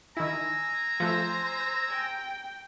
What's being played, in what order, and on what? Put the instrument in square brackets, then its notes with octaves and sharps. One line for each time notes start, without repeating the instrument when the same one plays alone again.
[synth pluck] D#3 E4 [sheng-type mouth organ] G#5 E6 [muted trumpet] A#5
[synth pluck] F3 A3 [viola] C5
[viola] G5